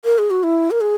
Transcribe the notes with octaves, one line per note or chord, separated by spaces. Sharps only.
A#4
G#4
F#4
E4
A#4
G#4